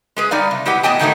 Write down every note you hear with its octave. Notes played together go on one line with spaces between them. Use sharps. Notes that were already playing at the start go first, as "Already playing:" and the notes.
G#3 G#4 B4
G3 D#4 D5 F5
C3
G#3 E4 G4 B4 F#5
A2 F#3 B3 D#5 G5 A5
G#2 D#3 F#3 A3 B3 D#4